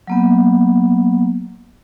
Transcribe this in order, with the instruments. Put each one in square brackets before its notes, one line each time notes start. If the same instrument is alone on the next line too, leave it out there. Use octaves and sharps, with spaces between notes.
[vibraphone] F#3 A#3 B3